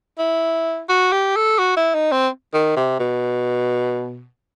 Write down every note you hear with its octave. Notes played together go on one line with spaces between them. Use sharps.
E4
F#4
G4
A4
F#4
E4
D#4
C4
D#3
C3
B2